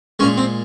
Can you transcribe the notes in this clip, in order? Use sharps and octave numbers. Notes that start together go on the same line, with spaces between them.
A#2 G#3 C#4
C4